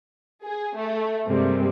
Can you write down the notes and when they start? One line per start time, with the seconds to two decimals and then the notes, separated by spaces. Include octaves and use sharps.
0.44 G#4
0.76 A3
1.28 G2 C3 G3 G#3 A#3 C4